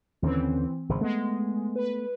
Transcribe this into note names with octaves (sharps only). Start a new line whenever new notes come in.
D#2 D3 E3 C4 C#4
G#1 C#3 F3
G#3 A3 B3
B4